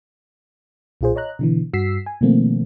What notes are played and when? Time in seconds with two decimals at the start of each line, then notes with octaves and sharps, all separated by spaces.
1.01 B1 A#2 F4 G#4 C5
1.16 C#5 D#5 A#5 F#6
1.39 B2 D3 E3
1.73 G2 F#4 E6 B6 C7
2.06 G#5
2.21 B2 D#3 F3 A3 A#3 C4